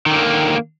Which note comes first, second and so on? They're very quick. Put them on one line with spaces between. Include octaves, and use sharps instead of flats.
D#3 D3 A#3